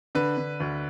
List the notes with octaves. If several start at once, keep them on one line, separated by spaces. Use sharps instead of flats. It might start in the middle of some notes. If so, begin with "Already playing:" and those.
D3 B4
D3
D2